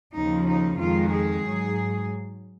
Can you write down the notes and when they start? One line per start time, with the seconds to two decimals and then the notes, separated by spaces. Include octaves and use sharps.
0.14 D#2 C#3 F3 D#4
0.47 D#4
0.79 F2 D#3 G#3 F4
1.12 G#4
1.44 G#2 F#3